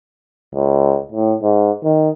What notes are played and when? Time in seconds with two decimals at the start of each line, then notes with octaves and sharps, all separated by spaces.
0.55 C#2
1.12 A2
1.42 G#2
1.84 D#3